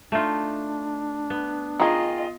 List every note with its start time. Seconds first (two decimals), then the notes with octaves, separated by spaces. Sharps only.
0.12 A3 D4 D#4 F4
1.30 B3
1.80 D#3 F4 G#4 D#5